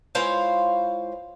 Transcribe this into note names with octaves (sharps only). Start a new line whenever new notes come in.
G#3 E4 F4 C5 C#5 F5